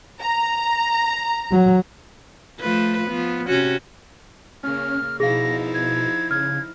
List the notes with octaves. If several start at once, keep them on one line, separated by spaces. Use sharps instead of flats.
A#5
F#3
F3 A3 B4
F3 B3
C3 C#4 F#4
C#3 A#3 C#4 F6
B2 F3 D#4 E4 G#4 F5 A#6
G#6
C#3 F6 G#6